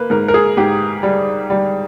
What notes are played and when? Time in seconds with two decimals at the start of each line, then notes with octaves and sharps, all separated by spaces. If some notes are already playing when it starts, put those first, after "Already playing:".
Already playing: A#3 B4
0.10 G#2 A#4
0.28 A#4
0.34 G#4
0.57 G#2 G4
1.03 G3
1.50 G3